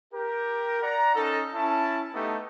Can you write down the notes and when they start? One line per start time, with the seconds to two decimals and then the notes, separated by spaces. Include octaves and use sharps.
0.13 G4 A#4
0.83 D5 F#5 A#5
1.16 C#4 D#4 A4
1.54 C#4 E4 A5
2.14 A3 B3 D#4 G4 A4